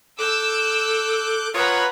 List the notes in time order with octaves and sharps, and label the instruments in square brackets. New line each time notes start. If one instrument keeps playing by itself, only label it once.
[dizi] A4 [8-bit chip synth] D6 F#6 G6 [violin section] E6
[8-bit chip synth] F4 C#5 [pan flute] B4 [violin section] F#5 A#5 B5 [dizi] D#6